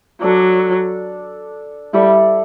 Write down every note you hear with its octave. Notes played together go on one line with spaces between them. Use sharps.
F#3 D4 A4 D5
G3 E4 A4 D5